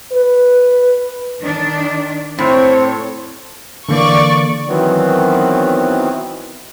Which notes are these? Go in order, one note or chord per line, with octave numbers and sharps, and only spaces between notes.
B4
D#3 D4
A2 C4 C#5
D3 E3 A#3 D5 C#6
D#3 E3 F#3 B3 C4